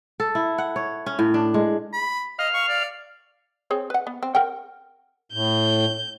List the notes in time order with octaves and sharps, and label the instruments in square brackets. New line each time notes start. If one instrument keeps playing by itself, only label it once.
[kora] A4
E4
F#5
C#5
C#4
A2
D4
G#3
[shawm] B5
[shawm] D#5 [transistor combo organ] F5
[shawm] C#6
D5
[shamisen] C4 G#4 C#5
B4 F#5
B3
C4
A#4 F#5 G5
[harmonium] A2 [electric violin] G6